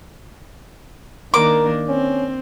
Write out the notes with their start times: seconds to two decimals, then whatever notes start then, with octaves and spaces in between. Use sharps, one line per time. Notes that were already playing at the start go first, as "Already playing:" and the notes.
1.34 D#3 A#3 D4 A#4 D6
1.88 C4 C#4